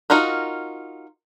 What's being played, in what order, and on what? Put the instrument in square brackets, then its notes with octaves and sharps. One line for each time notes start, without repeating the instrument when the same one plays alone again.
[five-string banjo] D#4 F4 F#4 A#4